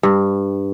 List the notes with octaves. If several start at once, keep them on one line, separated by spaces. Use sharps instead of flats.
G2